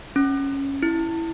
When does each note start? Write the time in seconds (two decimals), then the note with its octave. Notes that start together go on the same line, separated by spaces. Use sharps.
0.16 C#4
0.82 E4